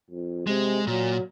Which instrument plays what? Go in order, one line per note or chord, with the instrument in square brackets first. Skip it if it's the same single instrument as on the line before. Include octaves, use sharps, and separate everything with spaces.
[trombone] F2
[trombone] C3 [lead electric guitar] G#3
[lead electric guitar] A#2 [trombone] F#3